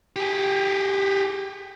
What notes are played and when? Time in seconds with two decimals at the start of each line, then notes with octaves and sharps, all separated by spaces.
0.16 G4 G#4